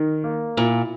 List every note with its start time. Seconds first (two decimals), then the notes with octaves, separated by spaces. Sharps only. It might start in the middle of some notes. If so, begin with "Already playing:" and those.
Already playing: D#3
0.24 A#3
0.57 A#2 E4